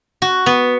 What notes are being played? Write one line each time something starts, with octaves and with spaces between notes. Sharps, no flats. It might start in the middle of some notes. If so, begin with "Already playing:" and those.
F#4
B3